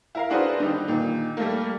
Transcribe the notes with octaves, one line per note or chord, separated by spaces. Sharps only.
E4 A#4 F5
D4 F#4 G#4 B4 C5
D3 D#3 G3 D#4
A#2 D#3
G3 A3 A#3